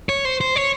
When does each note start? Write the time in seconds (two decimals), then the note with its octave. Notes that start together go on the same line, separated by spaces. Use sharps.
0.09 C#5
0.25 C5
0.41 C5
0.56 C#5